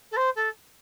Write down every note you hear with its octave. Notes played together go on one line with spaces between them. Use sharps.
A4
C5
A4